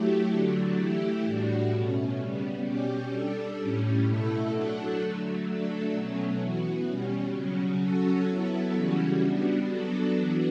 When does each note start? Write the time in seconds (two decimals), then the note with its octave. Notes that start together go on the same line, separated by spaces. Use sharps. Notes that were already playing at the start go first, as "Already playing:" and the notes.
Already playing: F#3 A3 E4 G4
0.30 D3 F#3 A3 D4
0.77 E3 A3 E4 G4
1.25 A2 G3 D4 F#4
1.71 B2 A3 C#4
2.18 C#3 G3 B3
2.64 B2 G3 C#4 G4
3.12 G3 D4 A4
3.58 A2 G3 C#4
4.06 B2 A3 E4 A4
4.52 F#3 A3 D4 F#4 A4
4.99 D3 F#3 A3
5.46 F#3 A3 D4 A4
5.93 B2 F#3 A3 C#4
6.39 E3 B3 F#4
6.87 B2 G3 C#4
7.34 C#3 F#3 C#4
7.80 F#3 C#4 F#4 A4
8.27 F#3 B3 E4 A4
8.74 C#3 E3 G3 C#4 F#4
9.21 G3 B3 D4 F#4
9.68 F#3 B3 D4 F#4 A4
10.15 E3 B3 D4 F#4